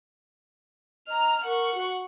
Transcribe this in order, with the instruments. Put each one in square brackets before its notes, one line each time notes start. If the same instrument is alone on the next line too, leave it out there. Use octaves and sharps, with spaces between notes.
[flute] D#5 [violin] A#5 F6
[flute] A#4 [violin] F#5 C#6
[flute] F#4